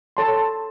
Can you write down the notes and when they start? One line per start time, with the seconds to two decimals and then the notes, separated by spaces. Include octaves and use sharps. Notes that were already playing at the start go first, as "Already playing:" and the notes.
0.17 A4 C#5 A5 C6